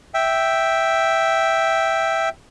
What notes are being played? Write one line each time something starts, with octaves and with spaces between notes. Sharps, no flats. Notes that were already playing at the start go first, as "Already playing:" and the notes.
E5 G5